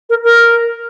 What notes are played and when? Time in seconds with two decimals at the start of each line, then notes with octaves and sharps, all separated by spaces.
0.09 A#4
0.23 A#4